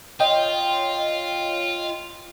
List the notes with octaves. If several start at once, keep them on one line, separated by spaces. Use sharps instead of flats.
F4 C#5 D#5 G5